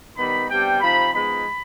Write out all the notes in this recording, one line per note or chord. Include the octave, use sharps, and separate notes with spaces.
D#3 G3 B3 D#4 B5
C3 G3 B3 D4 G5
C3 F3 C4 D#4 B5
F3 G#3 B3 D#4 B5